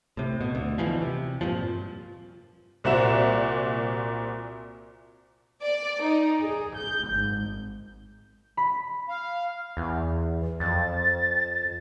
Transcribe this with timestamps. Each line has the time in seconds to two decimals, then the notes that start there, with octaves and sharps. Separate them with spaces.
0.17 A2 C3
0.41 B2
0.55 D2
0.78 B2 D3 E3 F3
1.02 C3
1.41 G2 A#2 F3
2.84 C2 A#2 F#4 C5 E5 E7
5.63 D5
6.02 D#4
6.40 G#4
6.76 G6
7.11 G#1
8.57 B5
9.09 F5
9.77 E2
10.60 F2 A6